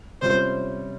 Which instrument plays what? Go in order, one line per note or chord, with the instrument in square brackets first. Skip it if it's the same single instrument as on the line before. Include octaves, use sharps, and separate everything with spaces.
[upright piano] C3 G3 C#4 F4 [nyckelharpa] C5